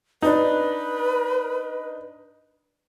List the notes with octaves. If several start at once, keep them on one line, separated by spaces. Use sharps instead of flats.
D4 D#4 B4